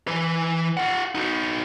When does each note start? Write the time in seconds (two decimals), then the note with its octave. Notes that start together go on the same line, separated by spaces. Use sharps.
0.08 E3 B4
0.77 F4 F#5
1.15 D#4 F#4